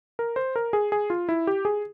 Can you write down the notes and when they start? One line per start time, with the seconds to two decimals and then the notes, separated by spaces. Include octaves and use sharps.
0.19 A#4
0.36 C5
0.56 A#4
0.73 G#4
0.92 G#4
1.10 F4
1.29 E4
1.47 G4
1.65 G#4